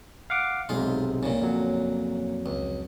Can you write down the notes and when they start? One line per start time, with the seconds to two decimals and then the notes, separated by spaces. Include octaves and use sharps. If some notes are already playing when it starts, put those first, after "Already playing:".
0.30 F5 F#5 D6
0.69 B1 G#2 C3 G#3 F4
1.23 A#2 C#3
1.41 F2 F#3
2.46 C#2